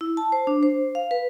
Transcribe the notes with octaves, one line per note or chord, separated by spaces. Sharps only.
E4
A5
C5
D4
C5
F5
B4